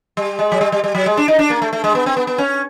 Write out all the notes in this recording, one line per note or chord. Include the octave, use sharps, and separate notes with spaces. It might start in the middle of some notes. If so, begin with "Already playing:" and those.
G3
G#3
F#3
G3
G3
G3
F#3
G#3
D4
D#4
D4
A#3
A3
A3
G#3
B3
C4
B3
B3
C#4